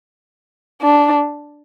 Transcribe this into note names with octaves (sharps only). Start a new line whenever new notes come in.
D4